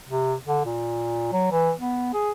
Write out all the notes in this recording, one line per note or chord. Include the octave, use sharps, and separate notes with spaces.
C3
D3
A#2
F#3
E3
B3
G#4